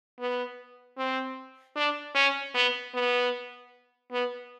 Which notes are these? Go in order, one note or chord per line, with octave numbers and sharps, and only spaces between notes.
B3
C4
D4
C#4
B3
B3
B3